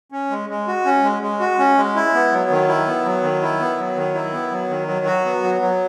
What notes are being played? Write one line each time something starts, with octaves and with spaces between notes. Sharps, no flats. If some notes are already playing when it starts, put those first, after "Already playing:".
C#4
G#3
G#3
F#4
C#4
G#3
G#3
F#4
C#4
G#3
E4
B3
F#3
D#3
E4
B3
F#3
D#3
E4
B3
F#3
D#3
E4
B3
F#3
D#3
F#3
F#4
B3
F#3
F#3